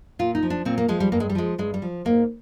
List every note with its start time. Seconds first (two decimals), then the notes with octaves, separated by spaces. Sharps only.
0.19 A#2 F4
0.35 D#4
0.43 F3
0.50 D4
0.65 A#2 C4
0.78 A#3
0.88 F3 G#3
1.00 G3
1.12 G2 A#3
1.20 G#3
1.30 G3
1.35 F3 G#3
1.58 G2 G#3
1.74 G3
1.82 F3
2.05 G#2 A#3